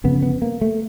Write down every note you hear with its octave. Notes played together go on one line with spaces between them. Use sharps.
G1 F2 C#3 B3
B3
A#3
A3